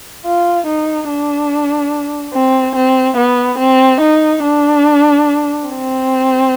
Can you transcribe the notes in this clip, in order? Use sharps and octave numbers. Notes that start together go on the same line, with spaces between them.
F4
D#4
D4
C4
C4
B3
C4
D#4
D4
C4